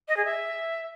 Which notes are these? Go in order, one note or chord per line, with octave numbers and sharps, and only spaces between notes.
D#5
G#4
E5